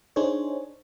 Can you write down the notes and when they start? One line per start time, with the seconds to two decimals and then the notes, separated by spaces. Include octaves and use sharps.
0.16 D4 D#4 G#4 C5 C#5